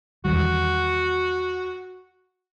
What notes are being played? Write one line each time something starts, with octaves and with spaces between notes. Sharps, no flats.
E2 D#3 G3 F#4